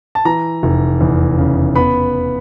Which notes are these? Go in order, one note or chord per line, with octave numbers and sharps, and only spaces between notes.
A5
E3 A#5
F1
E2
C#3
B3 B5